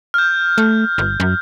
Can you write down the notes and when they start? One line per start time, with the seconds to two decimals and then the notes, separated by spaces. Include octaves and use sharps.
0.14 F6 G6
0.58 A3
0.98 G1
1.20 F#2